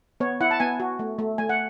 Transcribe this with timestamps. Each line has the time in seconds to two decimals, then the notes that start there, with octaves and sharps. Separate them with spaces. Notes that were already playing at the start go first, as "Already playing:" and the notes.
0.20 B3 C#5
0.41 E4 F#5
0.51 A5
0.60 B3 G#5
0.80 F#4
0.99 A3
1.19 A3
1.38 A3 G#5
1.49 F#5